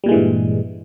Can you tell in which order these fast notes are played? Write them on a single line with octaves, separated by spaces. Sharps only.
G3 A#2 G#3 E3 G2